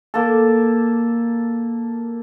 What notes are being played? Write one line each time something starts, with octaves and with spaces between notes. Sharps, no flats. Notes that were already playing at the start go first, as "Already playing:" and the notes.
A#3 A4